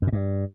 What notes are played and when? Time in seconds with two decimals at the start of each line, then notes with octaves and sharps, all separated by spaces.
0.02 F#2
0.07 A#2
0.13 G2